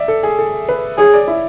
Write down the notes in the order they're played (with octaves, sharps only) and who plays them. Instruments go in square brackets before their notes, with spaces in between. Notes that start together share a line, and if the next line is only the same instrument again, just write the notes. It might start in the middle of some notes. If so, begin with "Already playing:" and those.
Already playing: [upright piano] D5 E5
A4
G#4
A4
B4
[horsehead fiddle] G#4 [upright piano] C#5
[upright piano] D5
E4